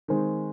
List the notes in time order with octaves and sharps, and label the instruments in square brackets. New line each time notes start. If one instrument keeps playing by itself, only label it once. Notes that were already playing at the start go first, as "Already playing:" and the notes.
[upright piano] D#3 G#3 C4